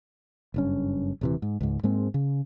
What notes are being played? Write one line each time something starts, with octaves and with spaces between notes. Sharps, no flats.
F#1 G2 C#4
D#1 C3 E3
G#2
C#2 G#2
G#2 G#3 A#3 C4
C#3